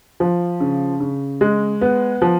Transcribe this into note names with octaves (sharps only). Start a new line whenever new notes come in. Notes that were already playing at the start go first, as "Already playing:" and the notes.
F3
C#3
C#3
G#3
B3
F3